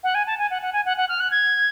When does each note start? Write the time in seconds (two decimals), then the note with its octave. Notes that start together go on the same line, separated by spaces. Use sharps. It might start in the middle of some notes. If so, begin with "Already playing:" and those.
0.03 F#5
0.14 G#5
0.26 A5
0.38 G#5
0.50 F#5
0.62 F#5
0.73 G#5
0.85 F#5
0.97 F#5
1.09 F6
1.20 F#6
1.31 G#6